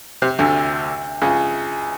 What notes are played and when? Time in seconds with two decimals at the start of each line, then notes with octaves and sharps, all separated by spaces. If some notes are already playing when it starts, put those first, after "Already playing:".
0.22 C3
0.39 D2 D3
1.22 C#2 C#3